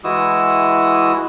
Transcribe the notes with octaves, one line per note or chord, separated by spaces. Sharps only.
E3 G#3 E4 F#4 D#6 E6